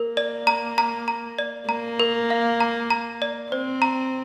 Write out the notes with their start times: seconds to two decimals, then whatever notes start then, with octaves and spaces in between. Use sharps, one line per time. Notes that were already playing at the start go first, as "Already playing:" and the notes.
Already playing: A#3 A#4
0.17 D5
0.47 A#5
0.78 A#5
1.08 A#5
1.38 D5
1.69 A#3 A#5
2.00 A#4
2.30 F5
2.60 A#5
2.90 A#5
3.22 D5
3.52 C4 C5
3.82 A#5